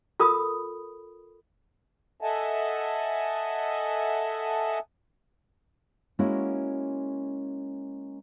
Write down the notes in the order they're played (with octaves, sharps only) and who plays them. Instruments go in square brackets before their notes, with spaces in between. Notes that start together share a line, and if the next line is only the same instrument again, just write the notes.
[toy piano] F4 A4 A#4 B5 D#6
[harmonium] A4 D#5 E5 F#5 G#5 A5
[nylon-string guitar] G#3 A#3 C#4 E4 F#4